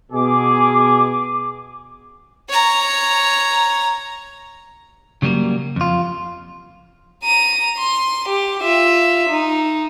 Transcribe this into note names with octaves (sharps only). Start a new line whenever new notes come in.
B2 G#4 D6
C#5 A#5
C#3 F#3 G3 A3 A#3
F2 F4
A#5 D#7
C6
G4
F4 E5
D#4